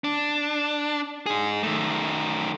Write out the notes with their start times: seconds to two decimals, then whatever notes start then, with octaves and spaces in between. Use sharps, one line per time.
0.04 D4
1.26 D#4 G#4
1.63 D#3 A3